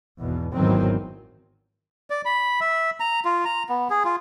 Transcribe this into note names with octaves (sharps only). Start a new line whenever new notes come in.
G#1 E2 B2
G#1 E2 D#3 F#3 C4
D5
B5
E5
A#5
F4
A#5
B3
G#4
F4